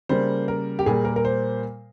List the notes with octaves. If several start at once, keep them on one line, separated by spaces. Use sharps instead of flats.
C#3 G3 A#3 C5
A#4
G4
A#2 G3 A#3 G#4
A#4
A#4
C5